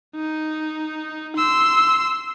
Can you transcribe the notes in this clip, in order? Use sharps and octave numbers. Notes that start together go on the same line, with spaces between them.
D#4
C6 E6